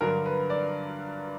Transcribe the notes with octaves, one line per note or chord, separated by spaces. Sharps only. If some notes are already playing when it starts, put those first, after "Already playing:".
G2 D3 F#3 A#4
B4
D5